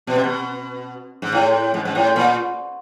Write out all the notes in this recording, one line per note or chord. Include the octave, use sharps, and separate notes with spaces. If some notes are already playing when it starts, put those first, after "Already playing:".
B2
C3
B2
G#2
A2
G#2
G#2
A2
A#2